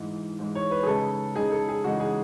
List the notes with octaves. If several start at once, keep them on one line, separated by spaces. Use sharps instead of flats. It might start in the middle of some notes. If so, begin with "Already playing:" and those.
Already playing: G#2 E3 G#3
G#2 E3 G#3
C#5
B4
G#4
C#3 G#3 D#4 A4
C#3 G#3 D#4 G#4
A4
G#4
C#3 E3 G#3 D#4 F#4
G#4